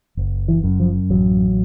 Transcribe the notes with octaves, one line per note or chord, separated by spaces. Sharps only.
F#1
E3
F#2
F3
A1 F#3